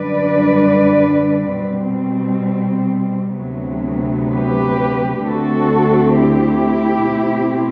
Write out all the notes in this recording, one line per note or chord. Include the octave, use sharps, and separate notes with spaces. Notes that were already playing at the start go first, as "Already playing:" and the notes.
Already playing: F#2 D3 G3 D4 B4 D5
B2 G3 C4
D2 C3 F#3 B3
G4 B4
D2 D3 A3 C4 F#4 A4
E4 G4
B2 A3 C4